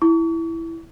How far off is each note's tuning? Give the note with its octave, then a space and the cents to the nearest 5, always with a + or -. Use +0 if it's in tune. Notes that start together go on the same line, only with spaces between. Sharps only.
E4 +0 C#6 +40